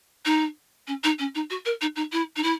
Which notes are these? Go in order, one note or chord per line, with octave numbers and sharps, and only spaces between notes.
D#4
C#4
D#4
C#4
D#4
F#4
A#4
D#4
D#4
E4
D#4
E4